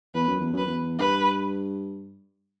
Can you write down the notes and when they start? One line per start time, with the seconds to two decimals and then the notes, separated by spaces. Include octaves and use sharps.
0.14 E2 B4
0.27 F#2
0.40 E2
0.52 F#2 B4
0.65 E2
0.99 G2 B4